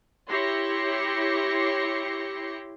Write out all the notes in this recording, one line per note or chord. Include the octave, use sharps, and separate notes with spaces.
E4 G4 C#5 C6 A#6 C#7